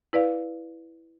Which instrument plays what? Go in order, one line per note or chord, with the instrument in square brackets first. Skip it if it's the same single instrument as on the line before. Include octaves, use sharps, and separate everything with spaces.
[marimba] E4 B4 D5 F5